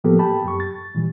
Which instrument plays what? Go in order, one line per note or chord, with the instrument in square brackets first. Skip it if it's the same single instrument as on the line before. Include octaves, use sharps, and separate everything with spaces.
[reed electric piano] A2 F3 A#3 B3 G4 A4
G4 G5 A5 B5
F#2 C#6
A6
A#2 E3 G3